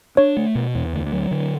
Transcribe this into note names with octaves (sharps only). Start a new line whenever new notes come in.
D4 C#5
A3
B2
E2
D2
F#3
D3